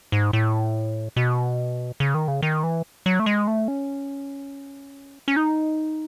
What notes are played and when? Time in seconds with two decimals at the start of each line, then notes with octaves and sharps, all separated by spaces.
0.12 G#2
0.33 A2
1.16 B2
2.00 C#3
2.15 D#3
2.28 C#3
2.43 D#3
2.64 E3
3.06 F#3
3.19 A3
3.26 G#3
3.48 A3
3.68 C#4
5.28 C#4
5.36 D#4